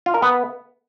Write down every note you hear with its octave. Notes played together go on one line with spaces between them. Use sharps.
F4
A#4
B3